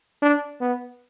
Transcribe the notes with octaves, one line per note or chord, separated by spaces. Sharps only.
D4
B3